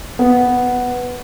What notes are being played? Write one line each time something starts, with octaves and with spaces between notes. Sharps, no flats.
B3